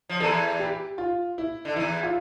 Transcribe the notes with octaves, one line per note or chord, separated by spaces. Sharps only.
F3
E2 E3 A4
G4
F4
E4
D3
E2 E3 E4
F4